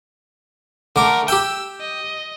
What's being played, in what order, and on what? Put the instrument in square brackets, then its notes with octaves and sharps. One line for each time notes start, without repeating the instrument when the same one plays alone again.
[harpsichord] D3 D6 [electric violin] A3 A#4
[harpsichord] G4 G5 [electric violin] E6
[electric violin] D#5